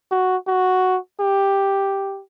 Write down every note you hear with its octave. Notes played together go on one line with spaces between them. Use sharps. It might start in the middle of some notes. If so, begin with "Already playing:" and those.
F#4
F#4
G4